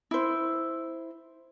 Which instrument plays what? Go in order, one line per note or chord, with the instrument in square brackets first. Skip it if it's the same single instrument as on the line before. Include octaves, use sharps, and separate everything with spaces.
[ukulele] E4 C5